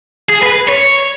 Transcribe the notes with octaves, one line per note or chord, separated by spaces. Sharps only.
G#4
B4
C#5